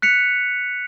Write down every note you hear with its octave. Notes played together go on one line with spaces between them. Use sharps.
F#6 B6 C#7 F7